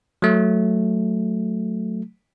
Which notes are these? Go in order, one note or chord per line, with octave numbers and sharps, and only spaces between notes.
F#3 A3